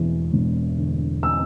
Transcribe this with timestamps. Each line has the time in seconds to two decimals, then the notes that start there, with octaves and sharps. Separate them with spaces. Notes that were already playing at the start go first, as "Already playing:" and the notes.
Already playing: E1 E2
0.33 E1
0.78 D3
1.23 E6